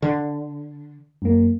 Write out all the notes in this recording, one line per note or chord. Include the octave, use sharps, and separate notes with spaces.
D3
F#2 A#3